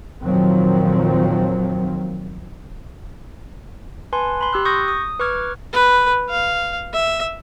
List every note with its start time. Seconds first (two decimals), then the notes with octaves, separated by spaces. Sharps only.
0.21 F2 A#2 D#3 F3 F#3 C4
4.13 B4 G#5 A5 C6
4.41 B5 C6
4.53 G4 E6 F#6
4.65 C#6 D#6 G6 A#6
4.88 D#6
5.20 B4 C#6 D6 F6 G#6
5.73 B4
6.30 F5
6.94 E5